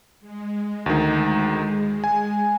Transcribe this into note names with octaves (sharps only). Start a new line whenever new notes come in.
G#3
D2 D#3
G#5